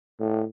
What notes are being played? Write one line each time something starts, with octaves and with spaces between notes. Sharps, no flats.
A2